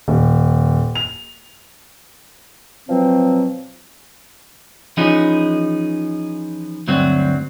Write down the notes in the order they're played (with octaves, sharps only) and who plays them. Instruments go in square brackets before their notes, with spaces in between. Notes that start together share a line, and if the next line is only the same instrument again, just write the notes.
[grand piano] D#1
F7
[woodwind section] B2 F3 F#3 C4
[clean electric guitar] E3 F3 C#4 D#4 G#4
D2 G2 F#3 C4 F#4